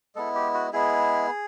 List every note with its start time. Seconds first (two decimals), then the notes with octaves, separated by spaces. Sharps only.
0.16 G#3 B3 E4 A4
0.35 G4
0.54 F#4
0.73 G#3 B3 E4 G#4